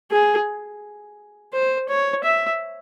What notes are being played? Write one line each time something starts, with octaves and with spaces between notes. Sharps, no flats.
G#4
C5
C#5
E5